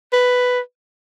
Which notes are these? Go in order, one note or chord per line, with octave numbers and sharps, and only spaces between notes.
B4